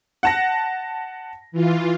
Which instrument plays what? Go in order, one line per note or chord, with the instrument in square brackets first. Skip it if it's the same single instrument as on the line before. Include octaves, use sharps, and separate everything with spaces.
[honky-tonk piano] F#5 A5 A#6
[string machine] E3 F4